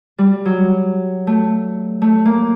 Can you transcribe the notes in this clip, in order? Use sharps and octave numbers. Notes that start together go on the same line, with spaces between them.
G3
F#3
A3
A3
A#3